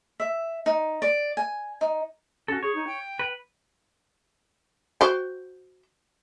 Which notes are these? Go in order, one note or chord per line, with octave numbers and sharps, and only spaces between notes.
E5
D#4
D5
G#5
D#4
C#4 F#4 A4
G#4 C#5
D#4
G5
B4
F#4 C5 G5